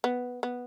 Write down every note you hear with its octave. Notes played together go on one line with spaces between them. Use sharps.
B3
B3